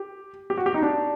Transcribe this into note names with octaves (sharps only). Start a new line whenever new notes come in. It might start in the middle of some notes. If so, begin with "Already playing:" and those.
Already playing: G4
G4
F#4
G4
D#4
D4